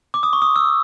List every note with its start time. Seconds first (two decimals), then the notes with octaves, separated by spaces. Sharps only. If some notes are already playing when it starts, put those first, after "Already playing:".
0.14 D6
0.23 D#6
0.33 C#6
0.42 D#6
0.56 E6